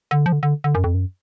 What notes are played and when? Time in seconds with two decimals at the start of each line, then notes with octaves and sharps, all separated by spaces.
0.11 D3
0.26 F3
0.32 D3
0.43 D3
0.64 D3
0.75 F#2
0.84 F2
0.94 F#2